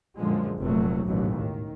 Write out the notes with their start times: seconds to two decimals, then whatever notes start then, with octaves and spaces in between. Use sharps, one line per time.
0.18 F#2 A#2 D3 F3 G#3
0.60 F1 A#1 F#3 A3
1.06 A1 D#2 G#2 B2 F#3
1.39 D#3